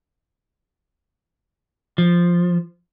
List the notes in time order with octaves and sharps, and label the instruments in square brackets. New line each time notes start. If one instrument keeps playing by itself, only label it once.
[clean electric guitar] F3